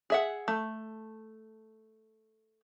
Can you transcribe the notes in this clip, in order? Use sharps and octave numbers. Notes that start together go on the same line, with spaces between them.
G#4 E5 F#5
A3